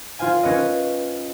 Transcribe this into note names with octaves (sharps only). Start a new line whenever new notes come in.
F4 C5 F5 G#5
C#4 B4 D#5